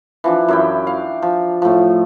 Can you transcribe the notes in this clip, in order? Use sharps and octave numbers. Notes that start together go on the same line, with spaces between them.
E3 F3 D4
F#2 E4 G5
F5
F3
A2 F3